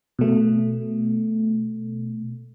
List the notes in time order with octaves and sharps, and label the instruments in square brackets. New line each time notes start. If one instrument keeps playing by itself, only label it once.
[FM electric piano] B2 A3